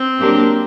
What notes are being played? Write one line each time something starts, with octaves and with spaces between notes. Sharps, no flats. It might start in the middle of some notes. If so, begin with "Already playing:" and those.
Already playing: C4
F#3 A#3 D4 G4 A#4